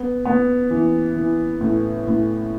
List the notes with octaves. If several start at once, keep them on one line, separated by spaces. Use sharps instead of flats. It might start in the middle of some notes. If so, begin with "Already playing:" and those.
Already playing: B3
B3
E3
E3
A2
A2